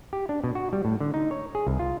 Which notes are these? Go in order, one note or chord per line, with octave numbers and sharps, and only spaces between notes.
G4
D4
B2
F#4
G3
A2
D3
D#4
C#5
G#4
C2
F4